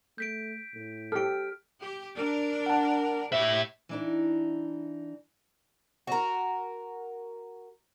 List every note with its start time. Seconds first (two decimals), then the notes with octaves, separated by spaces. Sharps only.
0.18 A3 G6 B6 D7
0.75 A2
1.12 G4 A4 F6 D7
1.81 G4
2.17 D4 A#4
2.66 F#5 A5
3.33 A2 G4 E5
3.89 E3 D4 D#4
6.07 F#4 A#4